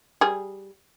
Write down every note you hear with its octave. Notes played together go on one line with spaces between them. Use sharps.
G3 G#4